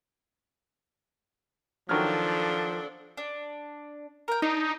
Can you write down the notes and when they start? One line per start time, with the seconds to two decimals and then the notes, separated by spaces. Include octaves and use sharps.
1.89 D#3 F3 F#3 D4 A4 F6
3.17 D4
4.28 A#4 G5
4.42 D4 D#4